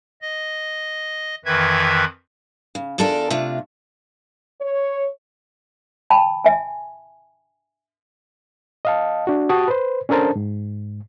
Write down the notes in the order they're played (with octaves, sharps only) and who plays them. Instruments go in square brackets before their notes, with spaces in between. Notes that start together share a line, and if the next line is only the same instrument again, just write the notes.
[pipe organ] D#5
F2 D#3 E3 B4 E5 G#6
[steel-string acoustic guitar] C#3
E2 D4 F4 A4 A#4 D5
C3 A3 D4 F4
[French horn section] C#5
[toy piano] G5 A5 B5
E5 G#5
[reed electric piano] D#5 F5 A5
D4 F#4
F#4 G4 A5 D#6 A6
B4 C5
C#4 D4 A4 A#4 C5 A5
G#2